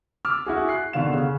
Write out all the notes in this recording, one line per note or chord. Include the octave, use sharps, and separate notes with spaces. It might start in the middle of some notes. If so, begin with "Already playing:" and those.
D6 E6 F6
E4 F#4 G#4
F#6 C7
B2 D3 D#3 F5 E7
C#3